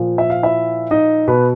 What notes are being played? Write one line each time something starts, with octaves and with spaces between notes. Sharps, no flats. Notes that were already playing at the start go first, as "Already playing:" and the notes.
Already playing: A#2 F3
E5
F5
E4 E5
D#4 D#5
B2 B3 B4